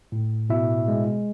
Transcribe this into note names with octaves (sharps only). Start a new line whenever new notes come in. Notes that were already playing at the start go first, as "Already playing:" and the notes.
A2
B2 E4 E5
G#3